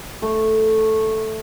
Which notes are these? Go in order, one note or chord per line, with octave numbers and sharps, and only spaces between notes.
A3